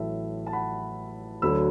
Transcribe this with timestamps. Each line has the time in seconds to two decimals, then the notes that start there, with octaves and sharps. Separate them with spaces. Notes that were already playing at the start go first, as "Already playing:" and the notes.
Already playing: A1 A2 F#3 E5 A5
0.47 A5
0.53 F#5 B5
1.42 D2 D3 F#3 B5 E6